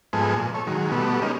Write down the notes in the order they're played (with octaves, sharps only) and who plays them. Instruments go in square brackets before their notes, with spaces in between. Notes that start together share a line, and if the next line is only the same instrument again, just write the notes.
[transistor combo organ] G#2 F3 G#3 B3 A4 G#5
A#2
A4 C#5
D#3 F#3 G#3
B2 G3 A3 B3
G3 G#3 A#3 C#4 D#4